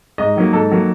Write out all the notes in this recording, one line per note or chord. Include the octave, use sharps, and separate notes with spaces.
G#2 D#5
D#3 F#3 A#3
G#2 A4
D#3 F#3 A#3